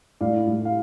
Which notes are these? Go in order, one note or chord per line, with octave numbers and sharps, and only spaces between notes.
A2 D5 F5
A2
F5